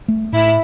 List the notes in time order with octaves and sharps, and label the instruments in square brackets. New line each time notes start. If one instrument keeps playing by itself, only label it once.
[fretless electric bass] A3
[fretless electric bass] A2 [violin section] E4